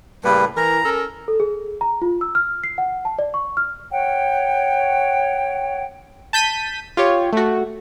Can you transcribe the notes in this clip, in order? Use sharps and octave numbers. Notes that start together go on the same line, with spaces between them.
A2 C#3 G3 A#3 B4
E3 A#4 A#5
C#4 A4 A#4
A4
G#4
A#5
F4
E6
F6
C7
F#5
A5
D5
C#6
F6
C#5 F#5 G5
A5 G6 B6 D#7
F4 G4 C#5
A3 F#4